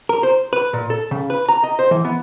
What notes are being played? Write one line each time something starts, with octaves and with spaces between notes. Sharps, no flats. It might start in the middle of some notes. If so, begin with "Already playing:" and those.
A#4
C5
B4
A#2
A4
C#3
B4
A#5
D#5
C5
E3
B3